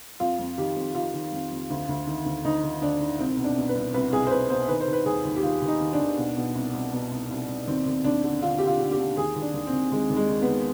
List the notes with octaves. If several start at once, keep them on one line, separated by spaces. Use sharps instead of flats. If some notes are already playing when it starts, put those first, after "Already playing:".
F2 F4
F2
D#3 G4
F2
D#3 F4
D#3
F2
F2
D2
D2
D#3
D2
D2 D#4
D#3
D2 D4
D#3
C2 C4
B2
D4
B2
B4
C2
C2 B4
C2 G#4
C5
C2 B4
B2 C5
D#3 B4
C5
D#3
B4
D#2 G#4
D#2
G4
D#2 F4
D#2
D#4
D#3
D4
D#3
B2
B2
C2
C2
B2
C2
C2
C2
D#2 C4
D#2
D#2 D4
D3
D3 F4
D3 G4
F4
D3
G4
D3
D#2 G#4
D#2
D4
D#2
C4
D#2
D#2 G#3
D#2
G#3
D#3
B3
D#3